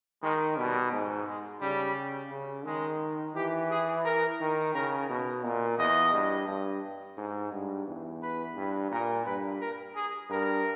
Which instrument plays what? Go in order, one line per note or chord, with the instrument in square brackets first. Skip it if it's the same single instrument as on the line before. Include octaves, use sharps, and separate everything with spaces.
[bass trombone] D#3 [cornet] G#3
[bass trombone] B2 [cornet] G3
[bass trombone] G#2
[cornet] G#3
[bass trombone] C#3 [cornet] G3
[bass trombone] C#3
[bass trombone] D#3 [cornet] G#3
[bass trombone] E3 [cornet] G4
[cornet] G#4
A#4
[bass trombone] D#3
[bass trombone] C#3 [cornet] A#4
[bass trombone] B2
A#2
[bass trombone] E2 [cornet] D#5
[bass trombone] G2
G2
G#2
G2
E2
[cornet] B4
[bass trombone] G2
[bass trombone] A#2 [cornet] A#4
[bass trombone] G2 [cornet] B4
[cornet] A#4
G#4
[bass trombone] G2 [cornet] A#4